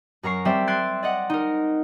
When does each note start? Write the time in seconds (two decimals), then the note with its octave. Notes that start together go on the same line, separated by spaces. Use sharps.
0.23 F#2 A#4 A#5 C#6 C7
0.45 G3 C4 C5 D5 E5
0.68 C6 F#6 G#6 A6 D7
1.03 D5 D#5 F#5
1.30 D#4 A#4